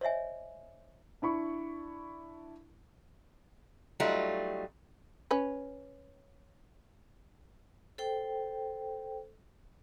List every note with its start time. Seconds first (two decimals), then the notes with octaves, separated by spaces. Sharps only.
0.01 C5 C#5 D#5 E5 G#5
1.22 D4 E4 B5 C#6
4.00 F#3 G3 A3 D#4 F4
5.31 C#4 B4
7.98 A4 C5 G5